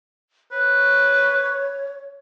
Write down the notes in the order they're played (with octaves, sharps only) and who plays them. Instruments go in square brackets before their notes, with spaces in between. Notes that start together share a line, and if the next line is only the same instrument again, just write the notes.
[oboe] B4 [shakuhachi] C#5